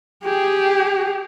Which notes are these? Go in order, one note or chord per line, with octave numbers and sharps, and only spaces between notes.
G4 G#4